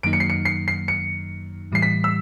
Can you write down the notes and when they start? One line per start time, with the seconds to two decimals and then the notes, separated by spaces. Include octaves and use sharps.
0.03 F#2 D#3 F#3 A#3 D#4 D7
0.13 C#7
0.20 C7
0.30 C#7
0.45 C7
0.68 C7
0.88 C#7
1.72 A2 E3 G3 C7
1.82 B6
2.04 E6